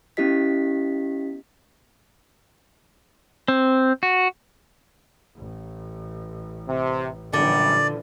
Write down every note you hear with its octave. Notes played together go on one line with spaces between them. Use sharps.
B3 C#4 E4 G4 D#5 B6
C4
F#4
A1
C3
B1 F#2 A#2 D3 E3 F3 G3 D5